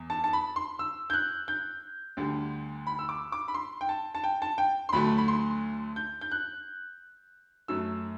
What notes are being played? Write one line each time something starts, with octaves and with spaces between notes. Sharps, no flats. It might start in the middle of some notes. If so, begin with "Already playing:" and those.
Already playing: E2
A5
A5
B5
C6
E6
G6
F#6
G6
D2 D3 G3
B5
E6
D6
D6
B5
C6
G5
A5
A5
G5
A5
G5
C6
D2 D3 F#3 A3 B5
B5
C6
G6
G6
F#6
F#2 F#3 A3 E6